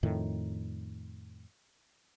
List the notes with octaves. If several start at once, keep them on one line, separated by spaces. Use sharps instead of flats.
F2 A2 D#3